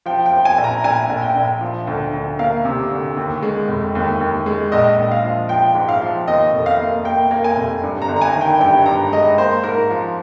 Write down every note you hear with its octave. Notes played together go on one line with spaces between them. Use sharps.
F3 G5
G5
F3
G#5
A#1
A#5
A#1 G#5
A#1
G5
A#1
F3
D2
D2
A#3 F5
C3
D2
D#2
G#3
F1
D#2
D#2
G#3
A#1 D#5
A#1
F5
F3
F3 G5
G#2
F5
F3
D#2 D#5
F1
F5
A#3
A#3 G5
A#3
G#5
F1
G2
A#5
G1
A#5
G#5
D#3
G5
G2 G5
G2 A#5
G#3 D#5
A#3 C5
G#2 A#4
F3